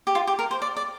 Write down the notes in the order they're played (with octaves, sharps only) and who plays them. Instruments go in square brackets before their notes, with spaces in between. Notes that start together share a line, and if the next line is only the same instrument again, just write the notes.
[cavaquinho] G4
F4
G4
A#4
C5
D5
D5